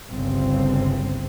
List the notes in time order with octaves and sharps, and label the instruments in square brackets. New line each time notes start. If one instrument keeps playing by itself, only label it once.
[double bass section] G1 C2 C#3 C4